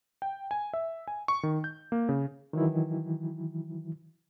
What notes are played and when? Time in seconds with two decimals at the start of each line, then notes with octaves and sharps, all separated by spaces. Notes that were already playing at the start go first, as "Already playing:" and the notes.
0.22 G5
0.51 G#5
0.74 E5
1.08 G#5
1.28 C#6
1.43 D#3
1.64 G6
1.92 A#3
2.09 C#3
2.53 D#3 E3 F#3 E4